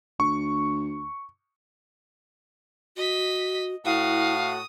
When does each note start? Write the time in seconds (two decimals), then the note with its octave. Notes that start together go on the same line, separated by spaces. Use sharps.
0.20 D2 C#6
2.97 F#4 D#5 B6
3.85 A2 E4 F#4 F5 D#6